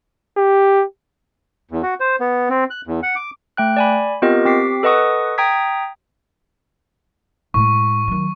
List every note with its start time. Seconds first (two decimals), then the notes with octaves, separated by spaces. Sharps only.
0.37 G4
1.71 E2
1.83 F#4
2.00 C5
2.20 B3
2.49 C4
2.70 F#6
2.87 E2
3.03 F#5
3.16 D6
3.57 A3 G5 F#6
3.77 D5 G#5 B5
4.22 B3 C4 F4 G4 A#4 D#5
4.45 C4 G4 D6 B6 C7
4.83 A4 B4 D#5 F#5 C#6 D#6
5.38 G5 A#5 D#6 G#6 B6
7.54 A2 G#3 C#6
8.08 D#3 F#3